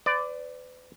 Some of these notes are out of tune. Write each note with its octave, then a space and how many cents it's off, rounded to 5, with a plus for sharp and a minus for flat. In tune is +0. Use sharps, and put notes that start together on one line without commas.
B4 +40 D5 +0